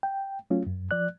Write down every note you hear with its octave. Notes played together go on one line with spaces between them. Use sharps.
G5
F#3 A3 C#4 F4
F#2
F3 D5 F#6